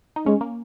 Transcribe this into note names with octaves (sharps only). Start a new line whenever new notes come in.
D#4
G#3 C#4
A#3